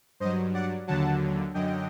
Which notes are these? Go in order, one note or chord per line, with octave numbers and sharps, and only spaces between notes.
G2 F#3 C5 D#5
D5 F#5
D#2 D3 F#3 F#5 A5
F#2 D3 F#3 D#5 G5